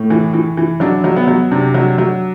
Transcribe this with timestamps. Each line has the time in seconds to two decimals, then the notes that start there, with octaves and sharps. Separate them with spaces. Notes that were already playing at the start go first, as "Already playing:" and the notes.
Already playing: A2
0.10 E3
0.33 E3
0.57 E3
0.80 F#3 D4
1.04 F#3
1.16 B3
1.28 F#3
1.51 C3 D4
1.74 F#3
1.98 F#3